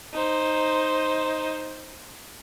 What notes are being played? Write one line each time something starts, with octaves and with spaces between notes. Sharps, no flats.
D#4 C5